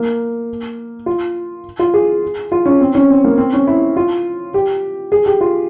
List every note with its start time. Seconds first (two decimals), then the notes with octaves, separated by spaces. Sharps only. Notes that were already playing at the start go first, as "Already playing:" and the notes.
Already playing: A#3
1.06 F4
1.79 F4
1.94 G#4
2.52 F4
2.66 C#4
2.80 C4
2.95 C#4
3.10 C4
3.24 A#3
3.38 C4
3.53 C#4
3.67 E4
3.97 F4
4.54 G4
5.12 G#4
5.26 G4
5.41 F4